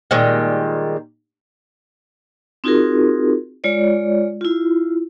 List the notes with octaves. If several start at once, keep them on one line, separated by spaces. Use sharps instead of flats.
A#2 D#3 G3 G#3
C4 D#4 F4 F#4 G#4 A#4
G#3 F4 C#5 D5
E4 F4